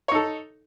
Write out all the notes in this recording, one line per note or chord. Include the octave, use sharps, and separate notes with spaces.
D#4 A4 C#5